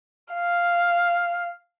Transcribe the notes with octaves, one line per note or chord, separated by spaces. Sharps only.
F5